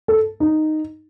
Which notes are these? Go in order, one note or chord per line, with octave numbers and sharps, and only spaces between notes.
A4
D#4